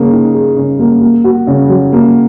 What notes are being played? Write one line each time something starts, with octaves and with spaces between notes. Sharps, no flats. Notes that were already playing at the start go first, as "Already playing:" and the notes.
Already playing: C#3 A#3 G#4
D#4
G#4
C#3
A#3
A#3
F#4
C#3
F#3
A#3